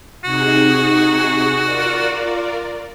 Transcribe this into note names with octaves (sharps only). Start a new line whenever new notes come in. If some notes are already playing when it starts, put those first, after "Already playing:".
C3 D#4 F#4 G#4
F4 A#4 D5